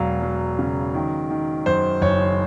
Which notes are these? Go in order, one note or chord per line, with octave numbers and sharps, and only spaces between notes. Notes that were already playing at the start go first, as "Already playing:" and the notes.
Already playing: E1 F#3 F5
F#3
C#3
D#3
D#3
F#2 C5
F#1 C#5